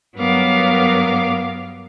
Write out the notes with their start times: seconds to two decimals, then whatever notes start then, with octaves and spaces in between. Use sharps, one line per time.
0.17 G2 F#3 B3 A#4 F5 D6